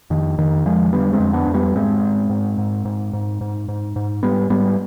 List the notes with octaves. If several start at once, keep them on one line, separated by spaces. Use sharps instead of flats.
F2 D#3
F2 D#3
F2 F3 G#3
D3 G3 B3
G#3 C4
F2
B3 D4
F2
G3 B3
G#2 G#3 C4
G#2
G#2
G#2
G#2
G#2
G#2
G#2
G#2
G#2 G3 B3
G#2 G3 B3